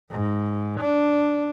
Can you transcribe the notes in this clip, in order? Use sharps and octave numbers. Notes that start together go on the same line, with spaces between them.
G#2
D4